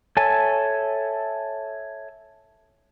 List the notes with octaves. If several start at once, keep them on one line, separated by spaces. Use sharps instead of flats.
A4 C#5 E5 G#5 A5